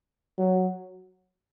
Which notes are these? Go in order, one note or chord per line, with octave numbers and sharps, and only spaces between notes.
F#3